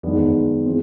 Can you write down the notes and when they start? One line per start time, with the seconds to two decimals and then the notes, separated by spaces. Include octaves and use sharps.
0.03 E2 G#2 D#3 G#3 B3 D4
0.14 F2
0.25 F#2
0.66 E3 G#3 C4